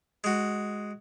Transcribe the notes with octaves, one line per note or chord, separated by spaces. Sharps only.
G#3 F#4